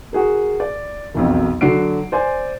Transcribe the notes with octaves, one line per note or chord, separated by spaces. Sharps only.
F#4 G#4 A#4
D5
E1 B1 F2
D3 F#3 D4 F#4 C7 D7
C5 D5 G#5